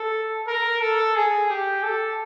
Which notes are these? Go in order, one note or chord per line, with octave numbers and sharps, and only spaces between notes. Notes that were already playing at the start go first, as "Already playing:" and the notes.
Already playing: A4
A#4
A4
G#4
G4
A4